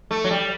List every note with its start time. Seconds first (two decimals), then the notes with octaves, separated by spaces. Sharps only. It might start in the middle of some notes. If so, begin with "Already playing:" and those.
0.11 A3
0.24 F#3
0.31 G3